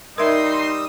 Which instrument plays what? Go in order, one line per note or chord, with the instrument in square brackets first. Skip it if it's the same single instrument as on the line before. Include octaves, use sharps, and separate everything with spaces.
[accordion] G3 D#6 E6 [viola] D#4 [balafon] A#4 E5 [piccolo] C6